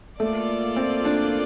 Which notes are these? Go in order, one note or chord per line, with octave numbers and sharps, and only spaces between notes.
A3 A#3 F4 A4 D5
C4
D4